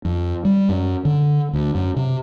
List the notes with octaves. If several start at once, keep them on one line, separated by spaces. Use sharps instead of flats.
F2
G3
F#2
D3
D2
F#2
C3